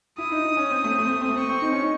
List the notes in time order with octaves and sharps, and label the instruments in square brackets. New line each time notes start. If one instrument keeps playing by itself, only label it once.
[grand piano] E4 [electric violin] D#6
[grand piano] D#4
D#4
C#4
C4
A3
C4
A3
C4
A3
C4
A3
[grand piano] C4 [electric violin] C#6
[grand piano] C4
D#4
C#4
D#4